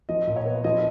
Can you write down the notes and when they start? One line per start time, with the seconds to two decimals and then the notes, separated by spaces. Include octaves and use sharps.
0.09 F3 D#5
0.27 A#2
0.36 C#5
0.46 B3
0.64 F3 D#5